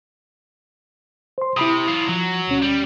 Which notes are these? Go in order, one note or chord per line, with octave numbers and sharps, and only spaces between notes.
C5 C6
C3 E4 B5 D#6
F#3 F4
F3 F#3
D2 B2 C#4
G3